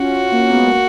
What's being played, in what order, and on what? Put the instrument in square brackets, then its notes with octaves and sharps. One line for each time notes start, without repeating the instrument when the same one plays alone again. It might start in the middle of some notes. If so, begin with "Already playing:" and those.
Already playing: [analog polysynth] C#4 F4 [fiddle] F#4
[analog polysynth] A#3 C#4
G#3 B3
A#3